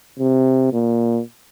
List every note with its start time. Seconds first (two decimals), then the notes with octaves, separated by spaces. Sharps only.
0.19 C3
0.73 A#2